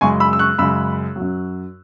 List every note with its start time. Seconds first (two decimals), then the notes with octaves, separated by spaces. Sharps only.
0.01 F#2 C#3 G#3 G#5 C#6
0.20 B5 E6
0.33 E6
0.39 C#6 F#6
0.58 F#2 C#3 G#3 B5 E6
1.16 F#3
1.21 F#2